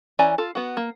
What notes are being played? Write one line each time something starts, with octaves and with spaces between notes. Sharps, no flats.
E3 C#4 D5 G#5 A#5
F4 A4
B3 F#4
A#3